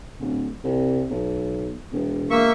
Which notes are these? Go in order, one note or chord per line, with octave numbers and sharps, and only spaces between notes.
D1
C2
B1
E1
A#3 E5 C#6